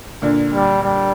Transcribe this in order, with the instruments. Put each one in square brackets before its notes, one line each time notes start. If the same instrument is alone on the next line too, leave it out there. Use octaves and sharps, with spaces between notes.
[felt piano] A#2 D3
[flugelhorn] G3
G3